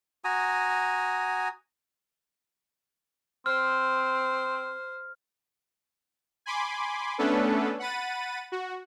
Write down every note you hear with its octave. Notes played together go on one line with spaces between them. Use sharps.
F#4 G#5 A#5 D#6
C4 C5 F6
G#5 B5 C6 D6
A3 B3 C#4 D4 A4 B4
F#5 B5 A6 D#7
F#4